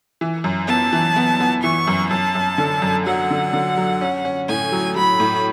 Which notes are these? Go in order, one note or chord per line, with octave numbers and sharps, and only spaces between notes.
E3
F#2
B3 A5
E3
B3
B3
E3 C#6
F#2
F#2 A5
F#2
D3
F#2
F#3 F#5
D3
D3
F#3
C#4
C#4
A2 G#5
F#3
F#3 B5
A2